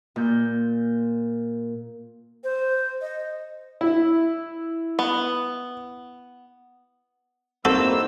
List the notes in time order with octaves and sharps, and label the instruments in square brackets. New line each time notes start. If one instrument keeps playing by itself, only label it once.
[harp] A#2 G6
[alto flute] C5
D#5
[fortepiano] E4
[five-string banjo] B3
[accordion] E3 E6 [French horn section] G3 A#3 D#4 [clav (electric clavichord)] C4 [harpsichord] F#4 A4